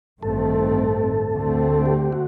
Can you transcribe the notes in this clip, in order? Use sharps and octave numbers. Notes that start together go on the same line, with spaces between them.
A1 G2 D#3 A3 C4 A4
D2 D3 A3 C4
G4
F#4